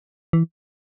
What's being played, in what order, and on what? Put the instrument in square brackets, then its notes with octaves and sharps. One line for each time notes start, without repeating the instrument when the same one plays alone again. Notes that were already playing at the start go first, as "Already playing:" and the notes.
[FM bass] E3